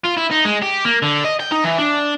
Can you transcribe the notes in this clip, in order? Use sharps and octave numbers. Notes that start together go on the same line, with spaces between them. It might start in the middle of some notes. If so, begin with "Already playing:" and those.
F4
E4
D#4
G#3
G4
A#3
D3
D#5
G5
D#4
E3
D4